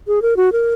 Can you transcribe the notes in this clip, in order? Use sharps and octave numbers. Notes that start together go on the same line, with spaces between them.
G#4
A#4
F#4
A#4